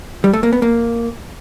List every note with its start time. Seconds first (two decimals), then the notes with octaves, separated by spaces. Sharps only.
0.24 G3
0.33 A3
0.43 A#3
0.53 B3
0.62 A#3